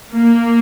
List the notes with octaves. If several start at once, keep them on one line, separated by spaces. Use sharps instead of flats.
A#3